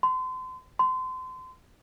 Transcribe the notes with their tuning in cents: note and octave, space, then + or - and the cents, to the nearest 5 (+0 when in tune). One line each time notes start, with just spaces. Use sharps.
C6 -35
C6 -30